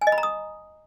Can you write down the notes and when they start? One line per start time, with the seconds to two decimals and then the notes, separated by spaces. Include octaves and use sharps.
0.01 G#5
0.07 D#5
0.12 B5
0.18 A#5
0.23 D#6